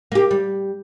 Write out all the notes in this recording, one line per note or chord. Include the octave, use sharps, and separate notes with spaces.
A#3 G4
G3